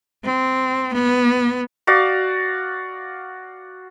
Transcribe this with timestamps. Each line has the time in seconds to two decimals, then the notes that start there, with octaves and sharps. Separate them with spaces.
0.25 C4
0.94 B3
1.87 F#4 D5 F5